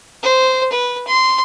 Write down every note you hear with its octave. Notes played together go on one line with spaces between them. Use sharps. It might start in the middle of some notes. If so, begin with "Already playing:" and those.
C5
B4
C6